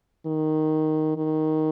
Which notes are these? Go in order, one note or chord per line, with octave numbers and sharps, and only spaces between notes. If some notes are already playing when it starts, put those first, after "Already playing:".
D#3
D#3